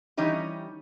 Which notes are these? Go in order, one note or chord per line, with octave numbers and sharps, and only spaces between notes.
E3 G3 C#4 D#4 G4